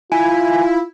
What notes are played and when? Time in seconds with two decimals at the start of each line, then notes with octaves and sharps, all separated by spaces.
0.12 E4 F4 G#5